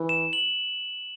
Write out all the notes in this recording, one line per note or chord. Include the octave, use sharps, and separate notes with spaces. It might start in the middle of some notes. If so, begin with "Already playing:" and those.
Already playing: E3
E7
F#7